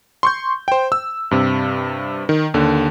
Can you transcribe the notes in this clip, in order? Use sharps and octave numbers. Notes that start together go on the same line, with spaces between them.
C6 C#6 G6
C5 G5
E6
G2 C3
D#3
D#2 D3